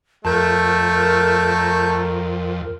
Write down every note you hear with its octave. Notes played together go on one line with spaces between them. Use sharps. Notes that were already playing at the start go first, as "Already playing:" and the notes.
F2 A3 A#4 A5 G6